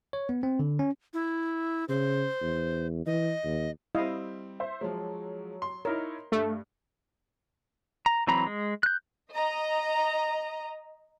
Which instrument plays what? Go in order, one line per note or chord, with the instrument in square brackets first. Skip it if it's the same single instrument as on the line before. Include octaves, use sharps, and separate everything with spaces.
[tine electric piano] C#5
B3
C4
D3
C#4
[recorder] E4
[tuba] C#3 [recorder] C5
[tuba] E2
[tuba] E3 [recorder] D#5
[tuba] D#2
[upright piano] G3 C4 [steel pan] E4 D#5 F5
[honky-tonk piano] C5 E5
[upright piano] F3 G#3 [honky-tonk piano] F#3
[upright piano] C6
[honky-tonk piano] D#4 E4 C#5 [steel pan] A#4
[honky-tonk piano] G2 [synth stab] A3
[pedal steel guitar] A#5
E3 F#3 C4 A#5 B5
G#3
F#6 G6
[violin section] D#5 A#5